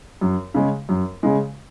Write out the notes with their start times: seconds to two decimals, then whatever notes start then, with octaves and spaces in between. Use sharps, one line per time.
0.21 F#2
0.54 C#3 G#3
0.89 F#2
1.23 C#3 G#3